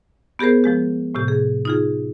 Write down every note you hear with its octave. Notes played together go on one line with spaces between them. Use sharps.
B3 G4 G#4 A#4 C5
F3 G#3 G4
A2 C3 G4
G#4
D#4 F4 G#4